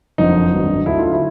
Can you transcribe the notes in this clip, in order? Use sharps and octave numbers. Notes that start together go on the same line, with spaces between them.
F#1 F2 D3 F3 D#4
G#1 G2 D3 F#3
D2 D3 F#3 A3 E4
F4
E4